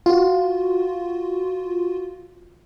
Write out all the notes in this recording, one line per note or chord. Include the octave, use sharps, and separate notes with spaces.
F4 F#4